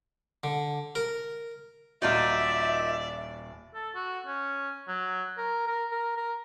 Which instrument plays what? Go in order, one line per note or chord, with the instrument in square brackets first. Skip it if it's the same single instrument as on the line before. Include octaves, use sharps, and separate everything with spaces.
[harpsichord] D3
A#4
[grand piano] D#1 F#4 [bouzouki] D#4 F4 A#4 [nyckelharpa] D5 [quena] E5
[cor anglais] A4
F#4
C#4
F#3
A#4
A#4
A#4
A#4